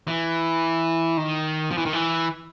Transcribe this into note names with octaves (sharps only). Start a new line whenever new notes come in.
E3
D#3
F3
E3
D#3
E3